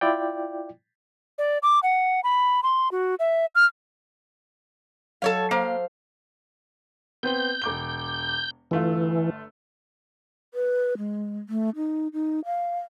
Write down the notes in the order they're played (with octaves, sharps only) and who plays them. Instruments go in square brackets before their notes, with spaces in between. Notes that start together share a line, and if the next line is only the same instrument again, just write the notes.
[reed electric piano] E4 F4 D5 G5
[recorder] D5
D6
F#5
B5
C6
F#4
E5
F6
[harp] F#3 [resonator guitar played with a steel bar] A4 C#5 F5
[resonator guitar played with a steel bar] A#3 [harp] C5 F5
[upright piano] B3 C4 [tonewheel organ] G6
[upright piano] E1 D6 G7
[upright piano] G1 A3 F4 [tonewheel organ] E3
[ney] B4
G#3
A3
D#4
D#4
F5